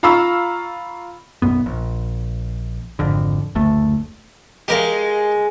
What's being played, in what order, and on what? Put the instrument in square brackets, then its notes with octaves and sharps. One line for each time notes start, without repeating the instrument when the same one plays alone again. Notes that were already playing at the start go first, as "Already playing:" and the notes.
[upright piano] F4 F5 A#5 B5 C#6 E6
[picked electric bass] B1 F#2 B3
A#1
G#1 F2 D3
F#1 D2 A3
[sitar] G#3 [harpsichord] G4 A#4 F5